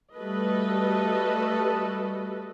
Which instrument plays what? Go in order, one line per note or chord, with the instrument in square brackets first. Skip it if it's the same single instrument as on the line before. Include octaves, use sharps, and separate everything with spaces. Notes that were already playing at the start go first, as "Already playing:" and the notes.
[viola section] G3 A3 F#4 A4 B4 D#5